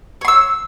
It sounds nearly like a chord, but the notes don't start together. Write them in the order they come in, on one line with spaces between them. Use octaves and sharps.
C#5 C6 E6